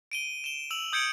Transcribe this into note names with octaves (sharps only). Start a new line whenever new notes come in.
D7 D#7 G7
E7 G7
E6 F7 F#7
D#6 G6 G#6 C#7 D7